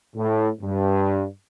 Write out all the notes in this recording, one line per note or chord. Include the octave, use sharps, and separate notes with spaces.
A2
G2